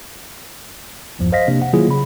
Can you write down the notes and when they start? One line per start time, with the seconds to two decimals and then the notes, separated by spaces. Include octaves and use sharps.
1.19 B1 E2 G2 F3
1.32 C5 D#5 F5 A#6 B6
1.48 C3 A#3 D4
1.62 F#5
1.73 D#3 F#3 A#3 E4 F4 G#4
1.89 C#3 B5